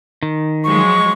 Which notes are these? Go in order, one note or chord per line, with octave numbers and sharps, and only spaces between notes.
D#3
F3 F#3 G#3 C#6